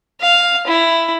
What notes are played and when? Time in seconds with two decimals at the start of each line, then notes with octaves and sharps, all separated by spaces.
0.21 F5
0.67 E4